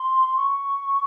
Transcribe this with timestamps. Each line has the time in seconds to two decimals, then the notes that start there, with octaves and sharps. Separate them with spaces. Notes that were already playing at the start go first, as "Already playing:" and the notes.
Already playing: C6
0.36 C#6